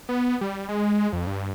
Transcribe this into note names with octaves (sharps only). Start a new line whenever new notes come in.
B3
G3
G#3
F2
G2